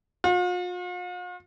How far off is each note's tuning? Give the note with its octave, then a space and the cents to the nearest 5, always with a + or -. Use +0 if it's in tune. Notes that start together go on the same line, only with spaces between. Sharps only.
F4 +45